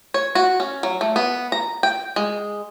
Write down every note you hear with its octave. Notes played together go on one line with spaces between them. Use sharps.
C#5
F#4
C#4
F#3
A3
B3
A#5
G5
G#3